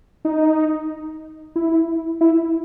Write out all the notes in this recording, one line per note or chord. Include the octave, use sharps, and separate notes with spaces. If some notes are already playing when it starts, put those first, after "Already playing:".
D#4
E4
E4